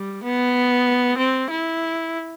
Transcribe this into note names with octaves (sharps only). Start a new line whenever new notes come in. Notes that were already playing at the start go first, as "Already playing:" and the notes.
Already playing: G3
B3
C4
E4